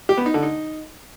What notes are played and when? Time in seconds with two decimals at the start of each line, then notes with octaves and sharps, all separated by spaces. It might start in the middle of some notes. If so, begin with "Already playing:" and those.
0.09 G4
0.17 B3
0.26 D#4
0.34 D3
0.43 D#4